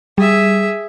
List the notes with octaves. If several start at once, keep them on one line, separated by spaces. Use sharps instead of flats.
G3 G#4 E5